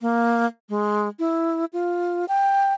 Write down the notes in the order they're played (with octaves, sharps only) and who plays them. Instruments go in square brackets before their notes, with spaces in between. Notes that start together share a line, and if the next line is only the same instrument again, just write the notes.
[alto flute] A#3
G#3
E4
F4
G5